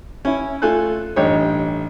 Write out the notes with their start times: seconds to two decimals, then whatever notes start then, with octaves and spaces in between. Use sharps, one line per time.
0.25 C#4 E4
0.62 A3 F4 A4 G#5 F#6
1.16 A1 G2 D#4 G4 C#5